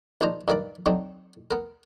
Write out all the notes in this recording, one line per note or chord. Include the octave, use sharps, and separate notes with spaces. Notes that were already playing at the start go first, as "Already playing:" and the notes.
A#1 D4 D#4 C5 A#5
G2 D#3 A#4 D5 B5
D3 F#3 C4 D4 D#4
B3 A#4